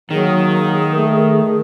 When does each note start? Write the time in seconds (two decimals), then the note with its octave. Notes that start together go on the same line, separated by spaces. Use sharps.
0.11 D#3 F#3 A#3 G#4
0.92 A3 A#4